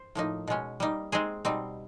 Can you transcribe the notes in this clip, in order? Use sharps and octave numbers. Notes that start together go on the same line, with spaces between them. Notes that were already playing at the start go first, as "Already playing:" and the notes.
Already playing: C5
A2 F3 A#3 D#4
B2 G#3 C#4
G3 A#3 D#4
G#3 C4 D#4 G#4 C5
B2 G3 C4 D#4